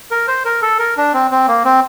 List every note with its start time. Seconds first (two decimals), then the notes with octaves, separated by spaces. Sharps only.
0.11 A#4
0.28 C5
0.45 A#4
0.62 A4
0.79 A#4
0.97 D4
1.14 C4
1.31 C4
1.48 A#3
1.65 C4